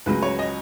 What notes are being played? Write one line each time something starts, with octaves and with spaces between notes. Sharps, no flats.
C#2 C#3 F#3 B4
C#5
D#5